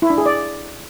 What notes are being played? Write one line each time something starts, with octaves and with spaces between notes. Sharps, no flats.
E4
D4
G#4
D5